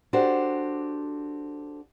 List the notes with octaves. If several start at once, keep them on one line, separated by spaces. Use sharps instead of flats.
D4 F#4 G4 A4 C5